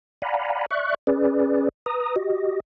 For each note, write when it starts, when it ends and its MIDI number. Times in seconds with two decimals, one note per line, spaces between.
0.22 0.66 74
0.22 0.66 77
0.22 0.66 78
0.22 0.66 80
0.22 0.66 82
0.22 0.66 83
0.71 0.94 74
0.71 0.94 76
0.71 0.94 85
0.71 0.94 90
1.07 1.69 61
1.07 1.69 68
1.07 1.69 71
1.07 1.69 74
1.86 2.16 71
1.86 2.16 82
1.86 2.16 87
2.16 2.60 66
2.16 2.60 67
2.16 2.60 75